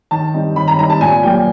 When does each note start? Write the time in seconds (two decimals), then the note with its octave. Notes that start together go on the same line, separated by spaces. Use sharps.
0.11 D#3 A5
0.34 G3 C4 D#4
0.56 D#3 B5
0.68 A#5
0.78 G3 C4 D#4 A#5
0.90 A5
1.01 A#2 G#5
1.23 F#3 A#3 G5